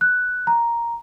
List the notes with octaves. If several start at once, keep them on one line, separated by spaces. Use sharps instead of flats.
F#6
A#5